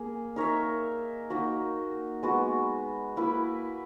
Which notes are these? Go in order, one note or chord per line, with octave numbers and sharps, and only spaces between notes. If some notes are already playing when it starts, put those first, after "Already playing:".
Already playing: A#3 G#4
D#4 A#4 C#5 E5
A#3 D#4 F#4
G#3 B3 F#4
A#3 E4 B4